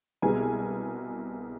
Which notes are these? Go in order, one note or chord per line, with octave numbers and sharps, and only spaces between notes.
C2 B2 G#3 G#5